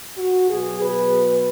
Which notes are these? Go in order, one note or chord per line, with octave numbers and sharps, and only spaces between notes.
F#4
B2 F#3 B3 G#4
B4